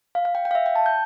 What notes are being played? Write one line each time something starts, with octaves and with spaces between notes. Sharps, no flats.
F5
F5
G5
G5
F5
E5
G5
A5
G6